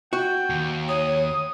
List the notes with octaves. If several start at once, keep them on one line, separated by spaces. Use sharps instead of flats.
F#4 G5
D#2
C#5 D#6